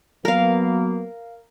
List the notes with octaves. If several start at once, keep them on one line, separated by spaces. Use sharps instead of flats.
F#3 A#3 B3 A#4 F5